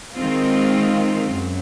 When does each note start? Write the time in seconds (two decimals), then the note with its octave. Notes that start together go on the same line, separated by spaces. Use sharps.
0.14 D#3 G#3 C4 F4
1.32 F#2